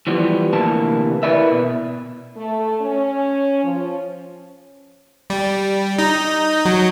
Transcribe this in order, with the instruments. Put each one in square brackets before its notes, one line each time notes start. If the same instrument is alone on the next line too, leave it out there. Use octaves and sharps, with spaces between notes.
[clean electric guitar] E3 F3 G3 B3
D2 C3 E3 A#3 A5
E4 A#4 B4 D5 E5
B2
[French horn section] A3
C#4
F3
[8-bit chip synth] G3
D#4
F#3